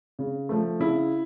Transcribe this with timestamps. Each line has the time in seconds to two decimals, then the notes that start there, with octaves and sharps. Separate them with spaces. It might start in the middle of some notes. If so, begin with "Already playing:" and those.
0.19 C#3
0.49 F3 A3
0.80 C#3 E4